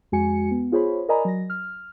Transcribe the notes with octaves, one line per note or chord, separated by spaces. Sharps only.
F2 G#3 F#4 G#5 C#7
B3
F4 G#4 C5 C#5 B5
A#4 D5 D#5 G#5 A#5 B5
F#3 A#6
F6